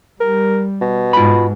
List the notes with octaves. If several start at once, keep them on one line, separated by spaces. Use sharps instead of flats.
G3 A#4
B2
G#2 F4 B5